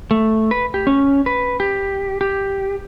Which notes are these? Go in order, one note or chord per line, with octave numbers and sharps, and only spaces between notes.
A3
B4
G4
C#4
B4
G4
G4